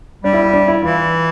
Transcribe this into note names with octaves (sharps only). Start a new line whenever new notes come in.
G3 D4
E4
E4
D4
E4
E3 F4